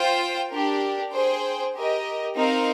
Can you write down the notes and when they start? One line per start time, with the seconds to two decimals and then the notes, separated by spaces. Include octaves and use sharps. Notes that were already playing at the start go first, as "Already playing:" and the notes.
Already playing: F4 C5 G5
0.51 D4 G4 A#4
1.13 G#4 C5 G5
1.74 G4 A#4 D#5
2.36 C4 D#4 A#4 F5